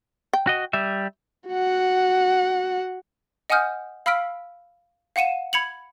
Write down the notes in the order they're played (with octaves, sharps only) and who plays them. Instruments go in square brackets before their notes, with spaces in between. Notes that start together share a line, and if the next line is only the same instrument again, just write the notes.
[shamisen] G5
[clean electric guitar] F#4 D#5
G3 E5
[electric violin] F#4 F#5
[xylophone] D#5 F#5 G#5 D#6 F6 G6
F5 B5 E6 F6 B6 D7
F5 F#5 C#7 D#7 E7
B5 G#6 C#7 F7 F#7